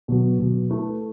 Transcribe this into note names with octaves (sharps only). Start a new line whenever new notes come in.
B2 F#3 B3
B2 F#3 B3
A3 E4 B4